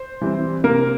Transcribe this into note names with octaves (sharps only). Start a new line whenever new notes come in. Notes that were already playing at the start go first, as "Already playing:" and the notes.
Already playing: C5
E3 G3 C4
C3 A#3 A#4